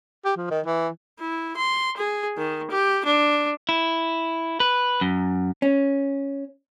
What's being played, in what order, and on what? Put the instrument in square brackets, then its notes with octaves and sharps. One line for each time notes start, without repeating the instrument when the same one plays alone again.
[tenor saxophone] G4
F3
D#3
E3
[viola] E4
C6
G#4
D#3
G4
D4
[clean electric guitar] E4
B4
F#2
[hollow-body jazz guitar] C#4